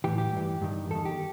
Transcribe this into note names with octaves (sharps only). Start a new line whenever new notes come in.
A2 E3 G4
G4
G2 E3
G2 D#3
E2 D#3 A4
G4